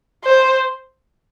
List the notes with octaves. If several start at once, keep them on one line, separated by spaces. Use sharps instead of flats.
C5